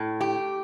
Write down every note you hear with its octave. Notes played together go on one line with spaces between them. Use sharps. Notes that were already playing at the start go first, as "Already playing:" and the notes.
Already playing: A2
G4